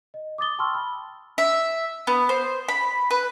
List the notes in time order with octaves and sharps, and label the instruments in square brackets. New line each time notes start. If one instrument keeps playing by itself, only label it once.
[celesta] D#5
D6 D#6 A6 G7
G5 A5 C6 C#6 E6 F6
B5
[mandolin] E5
B3
C5
B5
B4